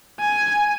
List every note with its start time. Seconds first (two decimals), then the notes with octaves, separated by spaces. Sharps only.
0.20 G#5